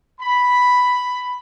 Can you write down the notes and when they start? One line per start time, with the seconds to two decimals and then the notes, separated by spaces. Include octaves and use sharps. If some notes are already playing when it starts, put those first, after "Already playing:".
0.20 B5